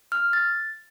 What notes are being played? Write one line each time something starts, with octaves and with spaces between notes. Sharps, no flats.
F6
A6